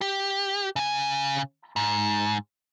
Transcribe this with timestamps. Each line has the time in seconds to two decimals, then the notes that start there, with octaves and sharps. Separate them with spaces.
0.01 G4
0.76 C#3 G#5
1.76 G#2